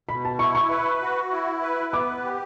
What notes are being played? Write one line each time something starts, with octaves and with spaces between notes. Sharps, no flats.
B2 B5
A5
E4 C#6
C#6
B4
F#4
E4
B4
B3 D6
G4